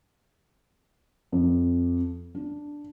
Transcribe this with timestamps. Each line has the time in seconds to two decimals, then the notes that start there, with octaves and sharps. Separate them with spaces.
1.32 F2
2.35 D4